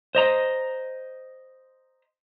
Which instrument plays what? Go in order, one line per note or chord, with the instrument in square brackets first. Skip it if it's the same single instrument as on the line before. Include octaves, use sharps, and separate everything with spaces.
[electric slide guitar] C5 D#5 A#5